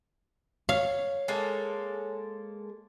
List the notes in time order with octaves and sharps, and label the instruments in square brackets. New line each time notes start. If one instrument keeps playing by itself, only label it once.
[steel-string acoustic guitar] C#5 [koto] F5
[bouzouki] G#3 A#3 A4